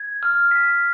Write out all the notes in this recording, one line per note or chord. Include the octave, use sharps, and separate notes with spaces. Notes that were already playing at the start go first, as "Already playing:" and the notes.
Already playing: G#6
F6
B6